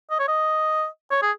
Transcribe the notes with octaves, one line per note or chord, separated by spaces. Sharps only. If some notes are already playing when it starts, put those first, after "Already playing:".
D#5
C#5
D#5
C#5
G#4